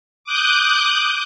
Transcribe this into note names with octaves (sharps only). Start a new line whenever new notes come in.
D6 D#6 F#6 G6